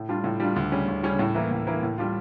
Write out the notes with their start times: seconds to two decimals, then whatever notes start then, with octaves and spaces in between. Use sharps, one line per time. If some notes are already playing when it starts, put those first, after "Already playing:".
Already playing: A2
0.09 G3 D4 F4
0.24 A2
0.40 G3 D4 F4
0.56 D2
0.72 C#3 G3 C#4
0.88 D2
1.03 C#3 G3 C#4
1.19 A2
1.35 E3 A#3 E4
1.51 A2
1.67 E3 A#3 E4
1.83 A2
1.98 G3 D4 F4